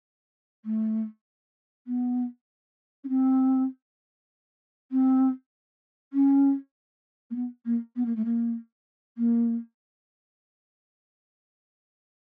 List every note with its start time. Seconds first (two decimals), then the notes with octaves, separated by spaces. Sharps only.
0.65 A3
1.87 B3
3.04 C#4
3.09 C4
4.91 C4
6.13 C#4
7.30 A#3
7.35 B3
7.65 A#3
7.96 B3
8.05 A#3
8.16 A3
8.25 A#3
9.17 A#3